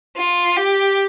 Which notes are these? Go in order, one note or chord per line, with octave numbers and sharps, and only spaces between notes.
F4
G4